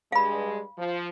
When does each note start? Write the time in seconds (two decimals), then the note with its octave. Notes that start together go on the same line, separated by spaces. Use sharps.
0.12 G2 G#3 F5 B5
0.78 F3